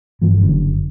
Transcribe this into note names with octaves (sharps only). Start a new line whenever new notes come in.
G2 E3 F3
F#1 F#2 D3